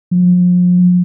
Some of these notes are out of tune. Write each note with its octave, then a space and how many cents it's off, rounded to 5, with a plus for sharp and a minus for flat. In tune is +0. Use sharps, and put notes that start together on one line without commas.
F3 +35